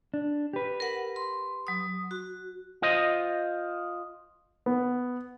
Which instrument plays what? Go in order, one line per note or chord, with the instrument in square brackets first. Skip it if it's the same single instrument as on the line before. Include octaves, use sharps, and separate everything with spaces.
[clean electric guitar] D4
G4 B4
[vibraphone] A#4 F#5
C6
F#3 D#6
F#4
[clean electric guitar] F4 C5 D#5
[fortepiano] B3